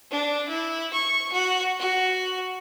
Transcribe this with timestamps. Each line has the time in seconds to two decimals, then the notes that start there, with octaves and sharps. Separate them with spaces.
0.11 D4
0.48 E4
0.93 C#6
1.32 F#4
1.79 F#4